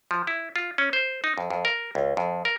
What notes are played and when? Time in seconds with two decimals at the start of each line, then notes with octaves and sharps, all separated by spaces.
0.11 F3
0.27 E4
0.56 F4
0.78 C#4
0.93 C5
1.24 D#4
1.38 F2
1.50 F2
1.65 A#4
1.95 C#2
2.17 F2
2.45 A#4